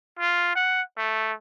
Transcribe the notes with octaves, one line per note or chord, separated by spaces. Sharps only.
F4
F#5
A3